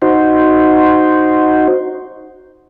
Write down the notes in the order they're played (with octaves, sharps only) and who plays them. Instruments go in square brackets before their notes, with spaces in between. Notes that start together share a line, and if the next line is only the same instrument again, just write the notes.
[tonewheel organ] D#4 F#4 C5